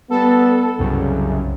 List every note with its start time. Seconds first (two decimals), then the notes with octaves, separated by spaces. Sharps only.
0.10 G3 B3 A4
0.78 C2 F#2 C#3